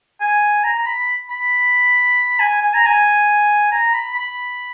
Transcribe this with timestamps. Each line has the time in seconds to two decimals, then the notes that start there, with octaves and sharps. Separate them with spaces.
0.20 G#5
0.64 A#5
0.78 A#5
0.86 B5
1.29 B5
2.40 G#5
2.61 G#5
2.74 A#5
2.86 G#5
3.71 A#5
3.93 B5
4.15 B5